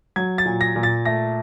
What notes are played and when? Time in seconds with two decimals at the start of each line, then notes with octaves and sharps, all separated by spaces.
0.16 F#3 G#6
0.38 A6
0.46 A#2
0.61 A#6
0.76 A#2
0.83 A6
1.06 A3 A#6